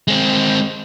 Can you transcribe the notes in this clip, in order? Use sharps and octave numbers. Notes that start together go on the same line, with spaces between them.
G#3 C4